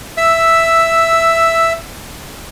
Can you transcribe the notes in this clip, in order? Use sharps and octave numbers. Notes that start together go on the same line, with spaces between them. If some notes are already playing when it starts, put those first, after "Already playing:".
E5 E6